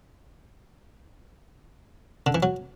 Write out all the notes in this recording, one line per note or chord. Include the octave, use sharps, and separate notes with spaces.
D3
E3
F#3